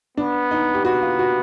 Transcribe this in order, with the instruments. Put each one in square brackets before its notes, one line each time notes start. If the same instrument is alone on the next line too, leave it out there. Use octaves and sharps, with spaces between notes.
[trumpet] B3 [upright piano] D4
[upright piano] D#4
G4
[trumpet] B3 [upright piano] F#4
[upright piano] F4
F#4